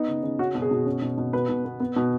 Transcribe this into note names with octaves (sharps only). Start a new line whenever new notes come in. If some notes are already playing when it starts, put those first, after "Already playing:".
Already playing: B3 D#4
C#3
C#3
C#4 F#4
B2
G#4
B2
C#4
B2
B2
B2 B4
B2
B3
B3
B2